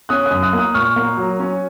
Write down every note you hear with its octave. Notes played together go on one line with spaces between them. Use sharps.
C#4 D#6 F#6
F#2 D#6 F#6
D#6 F#6
A#3
D#6 F#6
A#2 C#6 F6
A#3
F#3
C#4